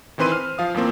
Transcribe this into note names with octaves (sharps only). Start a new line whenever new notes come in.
D#3 E3 C4 B4 C6 D#7
C5 F6
F3 F5 D#6
E2 F3 A#3 C4